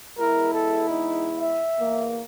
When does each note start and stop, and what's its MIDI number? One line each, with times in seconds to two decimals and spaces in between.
0.18 1.62 40
0.18 1.62 56
0.18 1.62 64
0.18 0.51 70
0.53 0.88 69
0.89 1.29 63
1.39 2.08 76
1.79 2.22 40
1.79 2.22 58